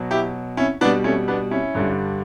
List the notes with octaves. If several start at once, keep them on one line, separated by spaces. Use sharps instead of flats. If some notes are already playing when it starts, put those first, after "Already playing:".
Already playing: B2 F#3
E4 G4
C#4 E4
B2 G3 B3 D4
A3 C#4
B3 D4
C#4 E4
G2 D3 G3